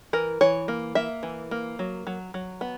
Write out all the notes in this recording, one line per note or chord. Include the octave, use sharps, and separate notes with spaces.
E3 A#4
E3 C#5
A#3
A#3 E5
E3
A#3
F#3
F#3
F#3
B3